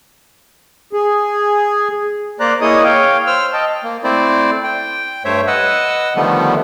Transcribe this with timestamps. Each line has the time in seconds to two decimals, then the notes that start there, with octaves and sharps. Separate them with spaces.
0.93 G#4
2.40 A#3 C5 D5 A#5 F#6
2.61 A#3 E4 G#4 C#5 D#5 D#6
2.84 C#5 F5 G5
3.27 C5 E6 F6
3.53 D#5 G5 A5
3.83 A#3
4.04 A3 C4 E4 C5 D5
4.64 G5
5.25 G2 A3 C5 C#5 E5
5.47 B4 D#5 F#5 E6
6.16 D3 D#3 F3 G3 A3 B3